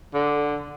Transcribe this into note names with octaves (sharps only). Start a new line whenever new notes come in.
D3